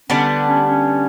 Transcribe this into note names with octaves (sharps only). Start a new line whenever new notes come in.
D3 G3 B3 C#4 D4
C#4
C#4